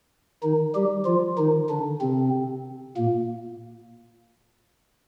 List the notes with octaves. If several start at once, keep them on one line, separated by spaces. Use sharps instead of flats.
D#3 D#4
G3 G4
F3 F4
D#3 D#4
D3 D4
C3 C4
A#2 A#3